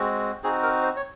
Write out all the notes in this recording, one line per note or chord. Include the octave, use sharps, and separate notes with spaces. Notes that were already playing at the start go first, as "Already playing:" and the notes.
Already playing: G#3 C4 F#4
C4 D#4 F#4 G#4
A#4
C5
C#5